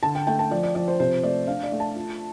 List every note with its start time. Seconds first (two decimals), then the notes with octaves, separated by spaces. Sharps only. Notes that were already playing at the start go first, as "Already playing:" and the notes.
0.03 D3 A5
0.15 G5
0.27 A3 G5
0.39 A5
0.51 F3 D5
0.63 D5
0.75 F3 D5
0.88 C5
1.00 C3 C5
1.23 A3 D5
1.47 D4 F5
1.63 D5
1.72 A3
1.80 A5
1.96 F4